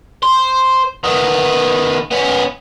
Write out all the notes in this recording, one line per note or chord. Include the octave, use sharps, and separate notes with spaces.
C5
D#3 B3
B3 C#4